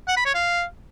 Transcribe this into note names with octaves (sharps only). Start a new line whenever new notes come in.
F#5
B5
C#5
F5